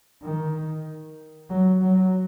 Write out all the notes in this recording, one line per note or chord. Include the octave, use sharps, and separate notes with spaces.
D#3
F#3
F#3